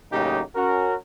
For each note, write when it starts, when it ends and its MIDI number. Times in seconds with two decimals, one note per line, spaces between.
0.11 0.41 45
0.11 0.41 49
0.11 0.41 54
0.11 0.41 58
0.11 0.41 63
0.11 0.41 67
0.55 0.95 61
0.55 0.95 66
0.55 0.95 70